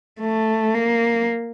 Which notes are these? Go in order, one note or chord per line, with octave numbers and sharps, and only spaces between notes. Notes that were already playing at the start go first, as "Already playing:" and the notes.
A3
A#3